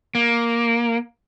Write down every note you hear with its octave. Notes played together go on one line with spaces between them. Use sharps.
A#3